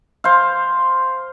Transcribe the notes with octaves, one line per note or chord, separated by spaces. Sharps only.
C5 F5